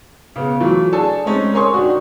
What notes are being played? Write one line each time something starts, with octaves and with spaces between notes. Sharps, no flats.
C#3 B3
E3 F#3 A3 F4
D4 G#4 A4 G#5 A5
G#3 A3 C4 C#4 D#4
A#4 C#5 G#5 C6 C#6 D#6
D#3 D4 F#4